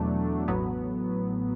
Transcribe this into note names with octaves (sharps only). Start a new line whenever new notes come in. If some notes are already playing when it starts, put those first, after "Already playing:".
Already playing: E2 B2 F#3 A3 D4
A1 A2 F#3 B3